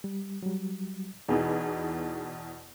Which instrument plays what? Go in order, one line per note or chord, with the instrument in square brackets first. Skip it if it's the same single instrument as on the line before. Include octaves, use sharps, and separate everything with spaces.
[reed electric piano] G3
F#3 G3
[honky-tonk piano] E2 B2 E3 [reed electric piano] D#4 G#4